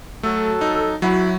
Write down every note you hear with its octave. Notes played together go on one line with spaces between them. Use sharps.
F#3 A3 A4
D#4
F#3 E4 F#4